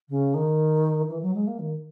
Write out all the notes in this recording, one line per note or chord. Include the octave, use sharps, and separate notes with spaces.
C#3
D#3
E3
F#3
G#3
A#3
D#3